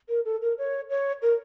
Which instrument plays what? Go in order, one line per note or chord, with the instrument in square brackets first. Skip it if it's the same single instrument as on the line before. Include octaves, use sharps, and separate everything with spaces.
[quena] A#4
A4
A#4
C#5
C#5
A#4